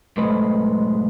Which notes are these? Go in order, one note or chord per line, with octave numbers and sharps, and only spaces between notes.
B1 G#2 A3 B4 C5 D#5